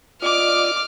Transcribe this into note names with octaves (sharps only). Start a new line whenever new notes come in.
F4 D5 D#5 D6 F6 D7